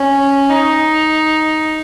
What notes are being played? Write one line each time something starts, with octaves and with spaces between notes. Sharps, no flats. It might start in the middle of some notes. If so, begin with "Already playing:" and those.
Already playing: C#4
D#4